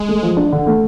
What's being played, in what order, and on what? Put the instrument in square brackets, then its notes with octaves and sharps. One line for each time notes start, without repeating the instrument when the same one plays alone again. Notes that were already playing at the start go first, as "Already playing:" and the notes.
Already playing: [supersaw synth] G#3
[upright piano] A3
F3
D4
D3
A3